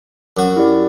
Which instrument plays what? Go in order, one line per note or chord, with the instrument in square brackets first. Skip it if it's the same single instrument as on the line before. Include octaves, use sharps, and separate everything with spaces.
[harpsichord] F#2 F#4
[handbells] E4 G4 D5